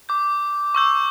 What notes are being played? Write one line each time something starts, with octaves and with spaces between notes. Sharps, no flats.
D6 G6
C#6 E6 G6